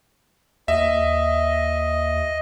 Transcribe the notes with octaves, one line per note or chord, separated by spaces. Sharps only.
D#2 D#5 E5